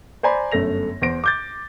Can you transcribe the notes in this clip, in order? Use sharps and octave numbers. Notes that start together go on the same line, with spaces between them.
C5 D5 G#5 A#5 B5
G1 F#2 A3 A#6 F7
E2 C5 A#6 D7
D6 G6 A6